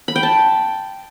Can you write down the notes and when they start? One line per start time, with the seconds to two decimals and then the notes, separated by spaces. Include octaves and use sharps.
0.08 B5
0.16 G5
0.23 A5